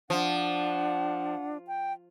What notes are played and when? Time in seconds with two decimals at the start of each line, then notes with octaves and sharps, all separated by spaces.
0.10 F3 D4 F#5
1.67 G5